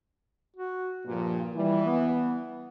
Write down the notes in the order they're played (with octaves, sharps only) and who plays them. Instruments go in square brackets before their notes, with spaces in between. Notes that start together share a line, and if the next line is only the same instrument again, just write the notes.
[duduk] F#4
[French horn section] G2 A#2 [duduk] F3
[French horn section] E3 [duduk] G3
[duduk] B3